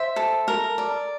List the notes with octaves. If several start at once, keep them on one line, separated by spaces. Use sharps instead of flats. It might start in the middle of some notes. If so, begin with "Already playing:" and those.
Already playing: C5 E5
A4
A#4
D5